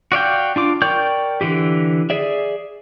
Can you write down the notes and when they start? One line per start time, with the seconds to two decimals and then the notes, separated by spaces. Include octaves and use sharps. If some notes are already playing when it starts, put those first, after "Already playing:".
0.12 F#4 D5 F5 G5
0.56 D4 F4 D6
0.82 A#4 D5 G5 C#6 G6
1.41 D3 E3 G4
2.10 G#4 D5 E5